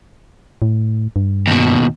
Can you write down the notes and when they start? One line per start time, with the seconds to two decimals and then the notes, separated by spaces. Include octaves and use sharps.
0.62 A2
1.16 G2
1.47 D#2 B2